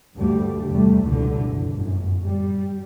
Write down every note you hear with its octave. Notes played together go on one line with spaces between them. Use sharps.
D2 G2 G3 A3
E2 C3 G3 A3
C#2 B2 D3 E3
F#1
G1 F#2 A2
G3